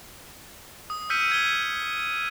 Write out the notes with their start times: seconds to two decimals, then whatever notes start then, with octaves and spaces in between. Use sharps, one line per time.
0.90 D#6
1.10 E6 F6 G6 B6 C#7 D#7
1.31 G#6 G7